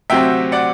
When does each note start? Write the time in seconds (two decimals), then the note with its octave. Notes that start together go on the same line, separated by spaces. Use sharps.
0.10 D2 C3 F#3 C4 E5 G5
0.52 D5 F#5